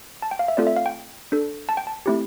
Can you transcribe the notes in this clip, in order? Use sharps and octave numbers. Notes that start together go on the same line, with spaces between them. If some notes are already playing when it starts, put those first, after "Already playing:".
A5
G5
F5
E5
A3 C4 F4 A4 D5
E5
F5
G5
D4 A4
A5
G5
A5
A3 C4 E4 G4